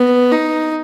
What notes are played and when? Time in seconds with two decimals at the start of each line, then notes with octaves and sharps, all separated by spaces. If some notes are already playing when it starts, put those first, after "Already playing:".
Already playing: B3
0.32 D#4